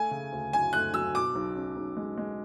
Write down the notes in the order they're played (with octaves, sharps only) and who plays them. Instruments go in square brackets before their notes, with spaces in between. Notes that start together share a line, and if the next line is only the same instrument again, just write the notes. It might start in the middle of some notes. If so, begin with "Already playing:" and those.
Already playing: [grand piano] A3 [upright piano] G#5
[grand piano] C#3
D2
[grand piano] F#3 [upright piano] G#5
[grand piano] A3 [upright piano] F#6
[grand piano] F#3 [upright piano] E6
[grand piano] B2 [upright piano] D6
[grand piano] B1
C#4
B1
G#3
G#3